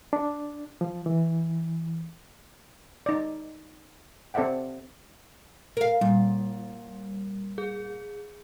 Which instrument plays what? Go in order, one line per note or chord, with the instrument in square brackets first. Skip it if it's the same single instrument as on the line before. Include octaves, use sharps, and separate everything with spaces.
[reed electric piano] D4
F3
E3
[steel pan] D#4 D5
C4 A4 D5 E5 F#5 G5
[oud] A#4 F5
[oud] A#2 [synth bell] G3
[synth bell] G#4